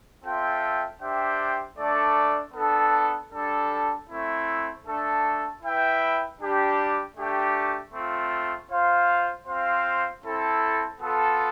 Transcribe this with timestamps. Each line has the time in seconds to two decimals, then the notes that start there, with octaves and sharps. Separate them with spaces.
0.24 C4 F4 A4 E5 G5
1.01 D4 G4 C5 E5 G5
1.78 A3 D4 A4 D5
2.54 B3 D4 A4
3.32 G3 D4 A4
4.09 A3 C4 E4
4.85 A3 D4 A4
5.63 E4 B4 E5 G5
6.39 G3 D4 G4
7.17 A3 D4 G4
7.93 A3 C4 F4
8.70 F4 C5 F5
9.47 C4 F4 C5 F5
10.24 C4 E4 A4
11.01 B3 F4 A4